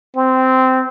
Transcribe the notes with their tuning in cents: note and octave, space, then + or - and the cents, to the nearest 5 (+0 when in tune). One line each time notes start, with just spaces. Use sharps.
C4 -15